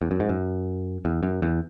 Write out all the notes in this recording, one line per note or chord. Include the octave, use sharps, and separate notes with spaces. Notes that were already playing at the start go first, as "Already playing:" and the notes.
E2
F#2
G#2
F#2
E2
F#2
E2